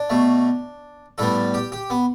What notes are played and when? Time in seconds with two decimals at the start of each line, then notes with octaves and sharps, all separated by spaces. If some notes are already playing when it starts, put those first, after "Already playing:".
Already playing: D4
0.10 B2 A3
1.18 A2 G3 B3 A4
1.54 G4
1.72 G4
1.90 B3